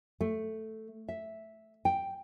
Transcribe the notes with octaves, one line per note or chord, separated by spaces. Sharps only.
A3
E5
G5